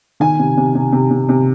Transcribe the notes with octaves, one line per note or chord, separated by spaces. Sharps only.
D#3 G#5
C3
C3
C3
C3
C3
C3